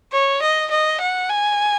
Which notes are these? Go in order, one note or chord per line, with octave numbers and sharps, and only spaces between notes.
C#5
D#5
D#5
F#5
G#5